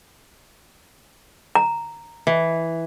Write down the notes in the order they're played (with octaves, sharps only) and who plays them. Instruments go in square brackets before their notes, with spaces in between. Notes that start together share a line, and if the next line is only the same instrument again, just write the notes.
[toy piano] A#5
[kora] E3